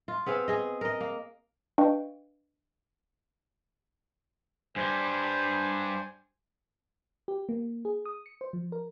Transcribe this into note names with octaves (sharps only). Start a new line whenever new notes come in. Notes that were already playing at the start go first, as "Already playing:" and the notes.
F4
B3 C4 G#4 F5
G#4 D#5
A#4 D#5
A#3
D4 B4 D#5 F5 G5 C#6
G2 G3 C5 G#5
G4
A#3
G#4
D#6
C#7
C5
F3
A#4